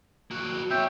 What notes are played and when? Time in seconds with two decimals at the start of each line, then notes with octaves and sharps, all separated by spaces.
0.31 A#3 F#4
0.71 C4 C#5 E5 G5